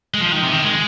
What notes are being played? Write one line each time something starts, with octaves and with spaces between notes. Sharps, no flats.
G#3
F3
D#3
C3
D#3
G#3